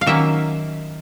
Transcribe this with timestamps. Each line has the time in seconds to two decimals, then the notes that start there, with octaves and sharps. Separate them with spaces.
0.01 F5
0.06 D#3 F#3 A#3 C#4 E5